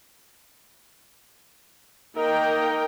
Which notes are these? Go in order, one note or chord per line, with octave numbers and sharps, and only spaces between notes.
A#3 D#4 A#4 D#5 G5